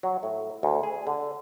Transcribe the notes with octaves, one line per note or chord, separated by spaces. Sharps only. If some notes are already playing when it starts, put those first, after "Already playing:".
F#3
A2
D2
G#4
D3